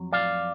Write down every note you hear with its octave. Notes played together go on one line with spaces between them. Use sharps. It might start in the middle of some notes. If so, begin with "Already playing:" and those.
Already playing: F2 F#3
D5 F5